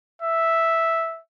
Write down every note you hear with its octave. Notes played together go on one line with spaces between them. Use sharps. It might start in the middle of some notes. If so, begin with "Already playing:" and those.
E5